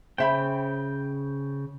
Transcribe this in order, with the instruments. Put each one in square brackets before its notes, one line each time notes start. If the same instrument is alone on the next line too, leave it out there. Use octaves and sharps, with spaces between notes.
[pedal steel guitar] C#3 G5 [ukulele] C5 E5 B5